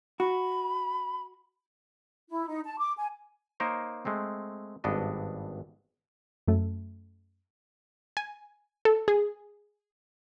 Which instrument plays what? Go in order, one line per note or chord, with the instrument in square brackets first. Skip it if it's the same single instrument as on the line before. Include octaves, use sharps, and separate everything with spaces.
[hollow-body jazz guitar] F#4 [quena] B5
[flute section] E4
D#4
A5
D6
G#5
[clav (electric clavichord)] A#3 D#4 A#4 C5 C#5
G#3 A3 C4
G#1 G2 B3 D4 D#5
[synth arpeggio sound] F#2 A3
[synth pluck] G#5
A4
G#4